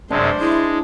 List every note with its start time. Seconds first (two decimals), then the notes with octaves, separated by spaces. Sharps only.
0.10 F#2 C3 G#3 D4 C5 D5
0.40 G#3 E4